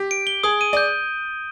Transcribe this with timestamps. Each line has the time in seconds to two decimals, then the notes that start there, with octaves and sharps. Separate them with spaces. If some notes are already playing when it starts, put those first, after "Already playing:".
Already playing: G4
0.11 D7
0.27 G7
0.43 G#4 D#6
0.61 D#7
0.73 D5 G6